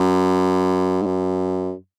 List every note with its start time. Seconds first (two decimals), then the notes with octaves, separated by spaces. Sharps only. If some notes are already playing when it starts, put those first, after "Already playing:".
Already playing: F#2
1.02 G#2
1.06 F#2